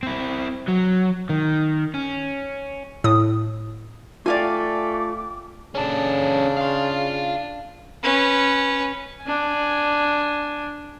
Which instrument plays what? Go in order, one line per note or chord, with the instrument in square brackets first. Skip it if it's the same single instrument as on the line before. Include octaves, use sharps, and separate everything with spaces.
[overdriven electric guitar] C4 E4
F#3
D#3
C#4
[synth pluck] A2 D#6
[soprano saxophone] A3 [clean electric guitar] F4 G5 [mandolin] D5 F5 G#5 [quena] D6
[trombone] C#3 [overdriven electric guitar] C#4 A4 [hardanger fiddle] D4
[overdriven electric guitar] F5 C6
[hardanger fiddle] C#4 B4
[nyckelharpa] D4 G#5